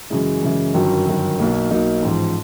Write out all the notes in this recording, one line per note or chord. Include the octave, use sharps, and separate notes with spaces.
F#2 C#3 E3 G#3
F#2 C#3 E3 G#3
G1 F#2 D#3 F#3
G1 F#2 D#3 F#3
B1 B2 F#3 A#3 D#4
B1 B2 F#3 A#3 D#4
A1 G#2 F3